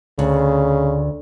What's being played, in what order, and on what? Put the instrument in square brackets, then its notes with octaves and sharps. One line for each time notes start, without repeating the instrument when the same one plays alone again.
[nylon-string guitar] D2 [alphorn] C#3